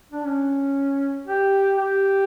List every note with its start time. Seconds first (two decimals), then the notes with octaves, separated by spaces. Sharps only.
0.12 D4
0.25 C#4
1.26 G4
1.76 G4